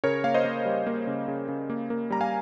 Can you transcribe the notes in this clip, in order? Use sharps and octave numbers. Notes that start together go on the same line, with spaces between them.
C#3 A#4 C#5
A#3 F5
C5 D#5
A#3
G3
A#3
C#3
C#3
C#3
A#3
A#3
G3 A#5
F5 G#5